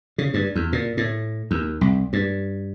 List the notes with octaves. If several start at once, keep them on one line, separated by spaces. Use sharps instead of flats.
C#3
G2
E2
A#2
A2
D#2
C2
G2